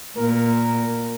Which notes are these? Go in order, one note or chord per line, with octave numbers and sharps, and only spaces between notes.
A#2 A#4